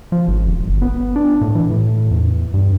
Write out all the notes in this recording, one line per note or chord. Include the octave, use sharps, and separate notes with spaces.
F3
G#1
D#1
G1
B3
D4
A2
E3
A2
E2
G2